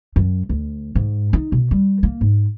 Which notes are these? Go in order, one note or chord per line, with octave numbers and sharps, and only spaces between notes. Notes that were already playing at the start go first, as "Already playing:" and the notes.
F#2
D2
G#2
D#4
B2
G3
A#3
G#2